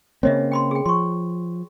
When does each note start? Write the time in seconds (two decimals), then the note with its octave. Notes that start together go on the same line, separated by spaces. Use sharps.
0.23 C#3 A#3 C4 C#5 D#5 E5
0.52 G5 B5 C6
0.71 G#4 G5
0.86 F3 C6 C#6